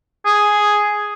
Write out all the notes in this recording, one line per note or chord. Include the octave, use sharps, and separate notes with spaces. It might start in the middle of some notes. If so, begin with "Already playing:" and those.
G#4